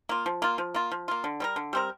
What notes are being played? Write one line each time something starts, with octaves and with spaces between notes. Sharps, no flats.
A#3 F4
F3
A#3 F4
F3
A#3 F4
F3
A#3 F4
D3
G3 C4 A#4
D3
G3 C4 A#4